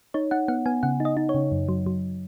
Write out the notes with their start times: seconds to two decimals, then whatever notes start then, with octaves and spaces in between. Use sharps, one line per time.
0.14 D#4 C#5
0.31 D#4 F#5
0.48 B3 F#5
0.66 B3 G#5
0.83 C#3 F#5
1.00 D#4
1.05 D#5
1.17 D#4
1.29 C#5
1.35 C#3
1.52 F#2
1.69 F#3
1.86 F#3